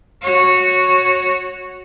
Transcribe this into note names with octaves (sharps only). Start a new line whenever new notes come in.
F#4 C#5